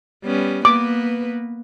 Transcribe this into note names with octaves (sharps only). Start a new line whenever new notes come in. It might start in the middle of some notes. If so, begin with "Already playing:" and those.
G3 B3 C#4
A#3 B3 B4 D6